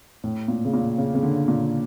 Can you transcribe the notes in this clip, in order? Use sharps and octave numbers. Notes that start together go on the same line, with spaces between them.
A2
A#2
C#3
A#2
C#3
C#3
D3
A#2